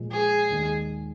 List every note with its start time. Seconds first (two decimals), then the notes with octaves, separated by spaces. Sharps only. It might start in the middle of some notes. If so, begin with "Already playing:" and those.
Already playing: A#2 F3 G#3
0.11 G#4
0.50 D#2 D#3 G#3